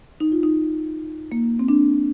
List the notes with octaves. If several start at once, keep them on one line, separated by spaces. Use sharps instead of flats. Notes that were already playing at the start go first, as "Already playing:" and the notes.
D#4
F4
D#4
A#3
C4
D4